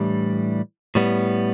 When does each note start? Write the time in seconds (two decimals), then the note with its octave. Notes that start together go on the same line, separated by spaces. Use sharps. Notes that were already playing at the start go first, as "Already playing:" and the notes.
Already playing: A2 E3 G3 D4
0.95 A2 G3 B3